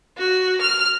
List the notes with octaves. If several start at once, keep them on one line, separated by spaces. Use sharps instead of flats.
F#4
F6